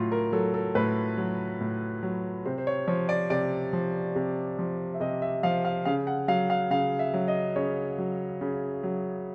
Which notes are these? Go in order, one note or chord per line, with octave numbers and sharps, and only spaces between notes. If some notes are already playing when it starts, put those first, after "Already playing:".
Already playing: A2 F#3 F4
A#4
F#3 A4
A4
A2 B4
F#3
A2
F#3
C3 C5
C5
C#5
F3 C#5
D5
C3 D5
F3
C3
F3
E5
C3 D#5
E5
F3 F5
F5
C#3 F5
F#5
F#3 F5
F5
C#3 F5
E5
F#3
D#5
C#3 C#5
F#3
C#3
F#3